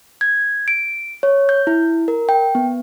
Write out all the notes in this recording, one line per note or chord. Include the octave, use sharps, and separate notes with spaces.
G#6
D7
C#5
G6
E4
A#4
G5
B3